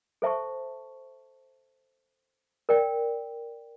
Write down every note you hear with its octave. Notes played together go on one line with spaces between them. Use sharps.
A4 C5 E5 A5 C#6
A#4 D5 G5